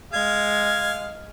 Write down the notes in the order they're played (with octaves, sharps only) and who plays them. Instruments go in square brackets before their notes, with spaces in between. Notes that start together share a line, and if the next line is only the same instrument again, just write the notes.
[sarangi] G#3 [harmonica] F5 [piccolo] G#6